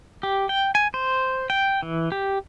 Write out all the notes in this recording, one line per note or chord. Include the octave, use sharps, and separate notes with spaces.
G4
G5
G#5
C5
G5
E3
G4